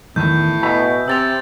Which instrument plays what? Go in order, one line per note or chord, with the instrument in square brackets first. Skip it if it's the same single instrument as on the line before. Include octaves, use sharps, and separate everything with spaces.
[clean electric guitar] E2 D#3 [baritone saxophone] A2 [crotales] G6
[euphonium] B2 [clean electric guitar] E5 G#5 B5
[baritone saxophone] C3 [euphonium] C4 [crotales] E6 A6 F7